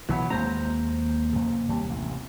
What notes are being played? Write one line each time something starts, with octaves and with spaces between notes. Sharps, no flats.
B1 E3 F#3 B3
D#2 G#3 A#3 C4 C5 A#5
F2 C#3
D#2 C3 G3
A1 C3